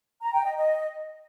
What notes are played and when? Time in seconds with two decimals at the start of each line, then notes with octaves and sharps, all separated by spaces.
0.22 A#5
0.34 G5
0.45 D#5
0.57 D#5